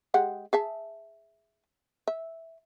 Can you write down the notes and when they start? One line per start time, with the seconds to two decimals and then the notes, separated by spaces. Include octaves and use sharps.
0.14 G#3 G4 F#5
0.53 G#4 E5 A5
2.08 E5